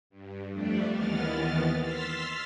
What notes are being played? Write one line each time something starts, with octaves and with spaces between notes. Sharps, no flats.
G2
F2 G3 A3 D4
D#2 D#3 E3 B3 F6 A6
C6 E6 F6 A6 B6